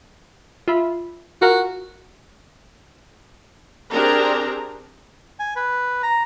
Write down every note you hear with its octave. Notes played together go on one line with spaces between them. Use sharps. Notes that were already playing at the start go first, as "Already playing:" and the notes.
F4 E5 B5
F4 F#4 A#4 F#5
C4 D4 G4 G#4 A#4 A#5
G#5
B4
A#5